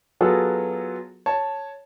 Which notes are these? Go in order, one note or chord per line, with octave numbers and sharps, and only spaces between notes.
F#3 B3 F4 F#4 G#4 A4
C#5 A5